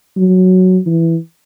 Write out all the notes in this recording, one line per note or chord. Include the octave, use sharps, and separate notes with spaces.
F#3
E3